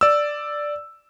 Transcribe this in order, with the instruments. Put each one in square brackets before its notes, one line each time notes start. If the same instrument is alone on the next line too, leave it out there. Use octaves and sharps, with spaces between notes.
[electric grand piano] D5 E6